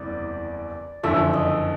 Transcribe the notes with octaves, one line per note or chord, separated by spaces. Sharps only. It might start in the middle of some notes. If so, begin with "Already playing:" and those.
Already playing: F#1 E2 C3 G3 D5
F#1 F2 D3 F3 E5
D#5